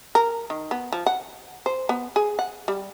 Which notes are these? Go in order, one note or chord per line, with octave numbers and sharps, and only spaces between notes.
A#4
D#3
B3
F3
F#5
C5
B3
G#4
F#5
G3